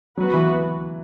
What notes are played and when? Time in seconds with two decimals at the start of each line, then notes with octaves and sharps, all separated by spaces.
0.17 F#3 B3 F#4 B4
0.34 E3